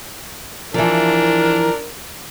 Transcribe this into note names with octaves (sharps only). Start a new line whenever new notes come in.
E3 F3 D4 A#4